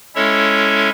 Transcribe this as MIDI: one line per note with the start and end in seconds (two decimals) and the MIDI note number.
0.15 0.90 56
0.15 0.90 61
0.15 0.90 64
0.15 0.90 69
0.15 0.90 73
0.15 0.90 76